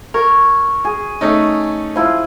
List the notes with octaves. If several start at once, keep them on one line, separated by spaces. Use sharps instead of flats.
A#4 C#5
G#4
A3 C#4 D#4
F3 E4 F4